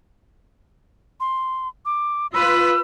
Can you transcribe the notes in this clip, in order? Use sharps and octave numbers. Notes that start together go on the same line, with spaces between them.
C6
D6
F4 B4 E6